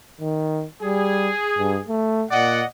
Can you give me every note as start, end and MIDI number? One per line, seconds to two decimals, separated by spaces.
0.21 0.65 51
0.83 1.31 55
0.83 1.86 68
1.58 1.80 43
1.88 2.25 57
2.32 2.62 46
2.32 2.65 74
2.32 2.65 75
2.32 2.65 78